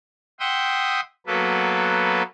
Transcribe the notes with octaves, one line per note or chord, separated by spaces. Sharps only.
E5 F#5 G5 C6 D#6
F#3 A#3 B3 A4 B4